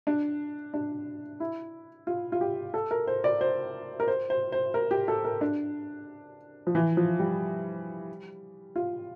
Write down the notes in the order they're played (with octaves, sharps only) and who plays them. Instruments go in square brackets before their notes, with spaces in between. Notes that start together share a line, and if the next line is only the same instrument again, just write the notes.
[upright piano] D4
D4
E4
F4
F4
G4
A4
A#4
C5
D5
C5
A#4
C5
C5
C5
A#4
G4
A4
A#4
D4
F3
E3
F3
G3
F4